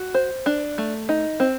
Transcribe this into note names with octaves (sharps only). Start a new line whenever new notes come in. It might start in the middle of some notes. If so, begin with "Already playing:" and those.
Already playing: F#4
C5
D4
A3
D#4
C4